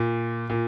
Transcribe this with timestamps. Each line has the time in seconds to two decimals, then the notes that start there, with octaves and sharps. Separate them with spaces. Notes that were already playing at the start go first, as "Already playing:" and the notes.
Already playing: A#2
0.50 A#2